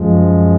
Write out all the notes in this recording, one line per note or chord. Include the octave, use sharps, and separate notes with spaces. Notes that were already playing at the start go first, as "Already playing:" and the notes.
Already playing: F#2 F3 G#3